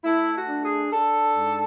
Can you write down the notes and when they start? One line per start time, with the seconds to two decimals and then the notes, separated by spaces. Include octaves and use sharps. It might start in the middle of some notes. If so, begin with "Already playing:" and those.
0.04 A3 E4
0.35 F#4
0.48 D4
0.63 G#4
0.92 D4 A4
1.36 G#2